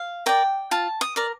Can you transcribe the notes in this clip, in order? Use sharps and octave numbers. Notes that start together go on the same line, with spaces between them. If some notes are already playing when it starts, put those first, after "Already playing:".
Already playing: F5
A#4 D5 G5
F4 A5
D#6
A#4 D5